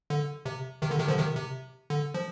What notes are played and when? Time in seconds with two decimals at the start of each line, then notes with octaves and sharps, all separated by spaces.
0.10 D3
0.46 C3
0.82 C3 D#3
0.91 D3
0.99 C3 D#3
1.08 D3 F3
1.18 C3 D#3
1.35 C3
1.90 D3
2.14 F3